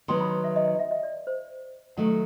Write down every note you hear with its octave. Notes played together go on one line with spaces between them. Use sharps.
D#3 F#3 B3 C6
B5
E5
D#5
D#5
E5
D#5
D5
C5
D#3 F#3 A3 F#5